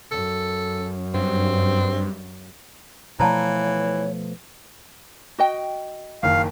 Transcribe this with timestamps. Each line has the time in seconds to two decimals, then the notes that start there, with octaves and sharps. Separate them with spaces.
0.11 F#2 A4
1.14 G2 C4
3.20 B2 E3 F3 A3 C#5 D5 A5 A#5
5.38 F#4 D#5 G5
6.23 F#1 D#3 F5